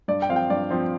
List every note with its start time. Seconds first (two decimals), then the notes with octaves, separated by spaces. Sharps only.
0.08 G2 D5
0.22 G5
0.29 F3 C4 F5
0.36 G5
0.50 G2 D5
0.70 F3 C4